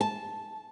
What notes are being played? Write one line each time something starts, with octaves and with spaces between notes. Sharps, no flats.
A5